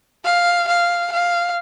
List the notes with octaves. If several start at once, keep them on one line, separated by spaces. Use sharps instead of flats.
F5
F5
F5